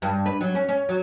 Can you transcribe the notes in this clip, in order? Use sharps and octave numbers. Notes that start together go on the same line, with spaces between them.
G2
B4
F#3
C#4
C#4
F#3